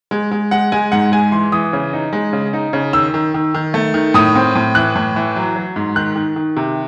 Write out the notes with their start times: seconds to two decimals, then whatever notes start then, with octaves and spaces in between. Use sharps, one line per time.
0.11 G#3
0.31 G#3
0.51 G#3 F#5
0.72 G#3 G#5
0.92 G#2 F#5
1.12 G#3 G#5
1.32 E3 C6
1.52 E3 D#6
1.73 C#3
1.93 D#4
2.13 G#3
2.33 C#3
2.53 D#4
2.73 C#3
2.93 D#3 E6
3.14 D#3
3.34 D#3
3.54 D#3
3.74 A3
3.94 D#3
4.14 A2 D#6
4.36 C4
4.55 A2
4.75 E3 F#6
4.96 A2
5.16 E3
5.36 F#3
5.56 F#3
5.76 G#2
5.96 D#3 F#6
6.16 D#3
6.36 D#3
6.57 C3